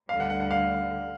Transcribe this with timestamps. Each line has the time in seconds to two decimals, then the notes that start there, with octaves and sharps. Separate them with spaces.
0.09 G3 F5
0.12 D2 D3
0.20 F#5
0.30 F#5
0.40 F#5
0.51 F5